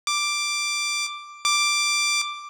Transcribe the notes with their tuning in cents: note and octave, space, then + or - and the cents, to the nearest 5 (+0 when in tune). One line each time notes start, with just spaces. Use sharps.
D6 +5
D6 +5